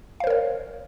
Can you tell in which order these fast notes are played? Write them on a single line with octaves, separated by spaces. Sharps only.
F5 C5 A#4 C#5